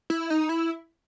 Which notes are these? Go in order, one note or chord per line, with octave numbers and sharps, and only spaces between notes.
E4
D#4
E4